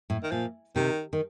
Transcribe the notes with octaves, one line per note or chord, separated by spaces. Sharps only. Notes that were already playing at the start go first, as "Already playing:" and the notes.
A2
D#3
A#2 F3
C3 D#3
D#3